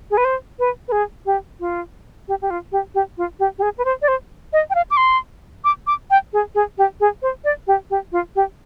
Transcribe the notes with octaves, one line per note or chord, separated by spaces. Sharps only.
G#4
B4
C5
B4
B4
G#4
G4
F4
G4
G4
F4
G4
G4
F4
G4
G4
G#4
B4
C5
D5
C5
D#5
G5
F5
D6
C6
D6
D6
G5
G#4
G#4
G4
G#4
C5
D5
G4
G4
F4
G4